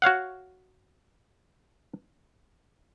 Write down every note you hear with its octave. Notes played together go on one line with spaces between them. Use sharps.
F#4 C#5 F5 F#5